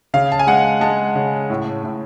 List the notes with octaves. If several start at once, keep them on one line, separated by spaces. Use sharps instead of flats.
C#3 F5
A5
G#5
G#3 F#5
G#3 A5
C#3
A2
A2